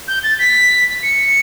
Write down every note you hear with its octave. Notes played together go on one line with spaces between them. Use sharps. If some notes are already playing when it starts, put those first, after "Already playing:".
G6
A6
B6
C#7